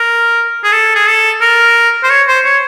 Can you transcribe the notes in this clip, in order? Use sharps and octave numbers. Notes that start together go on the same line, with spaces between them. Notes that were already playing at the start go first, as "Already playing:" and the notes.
Already playing: A#4
G#4
A4
G#4
A4
A#4
C5
C#5
C5
C#5